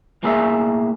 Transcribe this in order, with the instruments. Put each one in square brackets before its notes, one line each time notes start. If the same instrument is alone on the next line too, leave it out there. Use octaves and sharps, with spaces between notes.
[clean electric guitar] B1 A2 A#3 G#4 A#4 E5